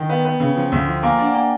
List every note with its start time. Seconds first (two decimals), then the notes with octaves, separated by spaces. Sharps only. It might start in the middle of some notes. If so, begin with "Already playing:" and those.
Already playing: D#3 G5
0.09 B3
0.25 B3
0.40 C#3
0.56 F3
0.72 D2
0.88 F3
1.03 A#3 G#5
1.19 D4 F#5
1.34 A#3 G5